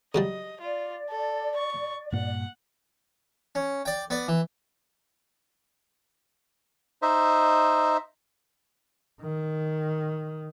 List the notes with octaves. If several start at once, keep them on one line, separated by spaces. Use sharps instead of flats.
C#3 F#3 G3 D#5
F4 D5
A4
C#6
G2 A#2 A#3 F#5
C#4
D5 G5
B3 D5
E3
D#4 C5 D#5 E5
D#3